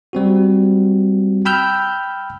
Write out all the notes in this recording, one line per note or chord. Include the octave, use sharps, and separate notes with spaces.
G3 C4 F#4
G5 B5 E6 F6 G6